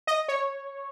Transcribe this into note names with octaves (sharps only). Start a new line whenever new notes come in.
D#5
C#5